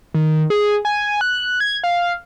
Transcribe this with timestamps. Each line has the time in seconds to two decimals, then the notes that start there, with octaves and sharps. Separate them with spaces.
0.14 D#3
0.50 G#4
0.85 G#5
1.21 F#6
1.60 G#6
1.84 F5